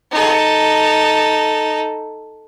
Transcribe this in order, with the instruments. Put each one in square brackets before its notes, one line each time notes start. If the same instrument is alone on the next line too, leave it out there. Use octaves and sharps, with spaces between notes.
[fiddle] D#4 A4